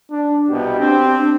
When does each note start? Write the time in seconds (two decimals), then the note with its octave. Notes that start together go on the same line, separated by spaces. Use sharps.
0.11 D4
0.50 C2 B2 G4
0.80 C4 D4